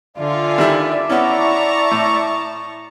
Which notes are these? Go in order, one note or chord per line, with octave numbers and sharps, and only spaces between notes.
D3 F4 D5 E5 G#5
D#3 G3 E4
B3 C#4 E4 A5 A#5 C#6
A2